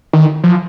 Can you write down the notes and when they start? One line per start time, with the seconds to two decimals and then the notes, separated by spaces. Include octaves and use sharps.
0.13 D#3
0.44 F3